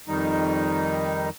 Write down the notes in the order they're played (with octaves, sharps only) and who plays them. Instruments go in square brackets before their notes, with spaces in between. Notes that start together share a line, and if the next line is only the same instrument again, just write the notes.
[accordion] F2 D#3 G3 D#4